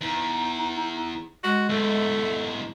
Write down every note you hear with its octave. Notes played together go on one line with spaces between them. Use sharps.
E2 D#4
G#3 F#4
E2 G#2 A3